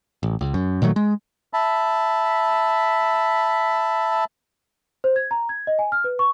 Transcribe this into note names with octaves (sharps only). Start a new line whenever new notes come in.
A1
C#2
F#2
A#2 D#3 F#3 A3
G#3
E5 A5 B5
C5
G#6
A#5
G#6
D#5
G#5
F6
B4
C#6